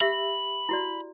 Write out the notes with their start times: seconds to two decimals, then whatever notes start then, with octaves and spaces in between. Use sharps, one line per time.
0.01 G4 E5 B5 E6
0.69 E4 F#4 D5